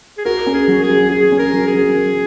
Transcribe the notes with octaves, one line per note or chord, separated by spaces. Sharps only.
G#4
F#4 A#4
C#4
G#4
F#3
G#4
F#3
F#4 G#4
C#4
A#4
F#3
G#4
F#3